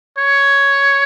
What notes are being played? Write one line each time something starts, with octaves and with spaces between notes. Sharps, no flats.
C#5